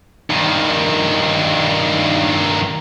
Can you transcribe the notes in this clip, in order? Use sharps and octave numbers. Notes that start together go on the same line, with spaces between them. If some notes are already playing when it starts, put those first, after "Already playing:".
G2 D#3